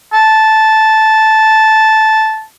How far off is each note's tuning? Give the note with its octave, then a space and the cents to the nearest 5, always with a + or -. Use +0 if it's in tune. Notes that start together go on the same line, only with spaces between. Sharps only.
A5 -10